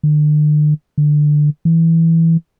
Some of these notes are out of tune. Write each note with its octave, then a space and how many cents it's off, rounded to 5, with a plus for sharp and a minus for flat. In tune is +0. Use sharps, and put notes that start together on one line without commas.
D3 +40
D3 +15
E3 -5